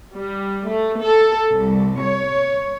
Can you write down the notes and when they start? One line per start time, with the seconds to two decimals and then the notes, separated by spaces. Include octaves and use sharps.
0.16 G3
0.68 A3
1.01 A4
1.55 C2
2.01 C#5